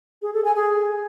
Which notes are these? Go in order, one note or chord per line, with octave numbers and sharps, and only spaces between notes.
G#4
A4
G#5
G#4